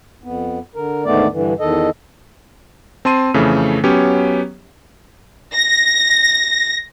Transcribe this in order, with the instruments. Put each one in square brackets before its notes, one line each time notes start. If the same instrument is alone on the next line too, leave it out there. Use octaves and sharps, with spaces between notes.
[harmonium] F2 B3
D3 A#4
D2 G#2 D#3 A3 B3 D5
G2 D3 E3
E2 D#3 A4 D#5
[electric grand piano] C4 A5 C6 D#7
F2 C#3 E3 A3
F#3 B3 C#4 G4 C#5
[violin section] A#6